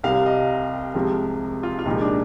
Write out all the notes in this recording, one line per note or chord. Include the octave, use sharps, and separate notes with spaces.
C2 C3 G3 F5
D#5
C2 C3 F3 G#3
F4
F4
C2 A#2 F3 G#3 D#4
D4